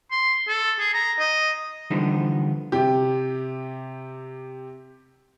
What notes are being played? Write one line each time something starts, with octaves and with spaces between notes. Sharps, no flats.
C6
A4
G#4
A#5
D#5
D3 E3 F3 G3 B3 D#4
C3 G4